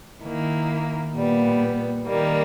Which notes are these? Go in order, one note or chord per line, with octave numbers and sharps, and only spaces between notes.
D#3 A#3 E4
A#2 G3 B3
D#3 G3 A#3